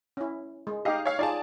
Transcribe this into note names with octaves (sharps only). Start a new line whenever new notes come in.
C#4 E4
G#3
D#4 G4 D#5 F5
C#5 F5
D#4 F4 G#4 D5 G#5 A5